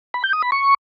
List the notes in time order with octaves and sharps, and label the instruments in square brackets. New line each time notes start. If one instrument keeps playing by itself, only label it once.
[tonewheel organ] B5
G6
D#6
B5
C#6